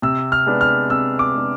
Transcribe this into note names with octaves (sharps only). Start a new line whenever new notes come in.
C3 E6
F6
G#3 B3 D4
F6
C3 E6
D6
G#3 B3 D4